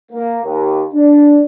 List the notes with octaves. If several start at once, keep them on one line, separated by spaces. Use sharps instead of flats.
A#3
D#2
D4